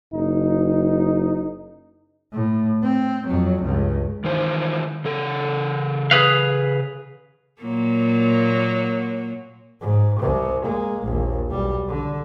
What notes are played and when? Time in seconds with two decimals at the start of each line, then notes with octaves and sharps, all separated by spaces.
0.14 F#1 D#4
2.33 A2
2.82 C4
3.27 F2 F#3
3.62 C#2 G2
4.24 D#3 E3 C5
5.05 C#3 A4
6.11 G#4 B4 F5
7.61 A#2 F#3 A#3
9.81 G#2
10.20 C2 C3
10.65 G#3 A#3
11.03 A#1 D#2
11.50 B1 G3
11.89 D3